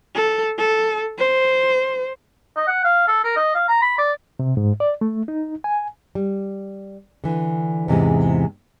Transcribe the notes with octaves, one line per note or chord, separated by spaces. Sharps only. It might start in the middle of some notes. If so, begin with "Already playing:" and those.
A4
A4
C5
D#5
F#5
F5
A4
A#4
D#5
F5
A#5
B5
D5
C3
G#2
D5
A3
D#4
G#5
G3
D3 E3
E2 G#2 C3 E3 G#3